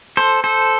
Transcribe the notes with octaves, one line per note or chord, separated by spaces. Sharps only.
A4 C5
A4 C5